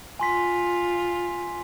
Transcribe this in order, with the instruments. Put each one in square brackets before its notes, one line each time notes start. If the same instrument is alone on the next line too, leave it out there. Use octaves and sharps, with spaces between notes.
[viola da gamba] F4 [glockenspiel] G#5 C6 B6